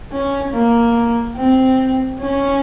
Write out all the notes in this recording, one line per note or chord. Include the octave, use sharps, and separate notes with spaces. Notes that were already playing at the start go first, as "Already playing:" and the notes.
C#4
A#3
C4
C#4